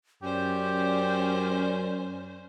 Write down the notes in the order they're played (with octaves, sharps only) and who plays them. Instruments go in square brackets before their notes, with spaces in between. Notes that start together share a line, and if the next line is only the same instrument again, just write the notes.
[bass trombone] F#2 [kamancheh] C#4 C5 [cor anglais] G4 [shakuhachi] D5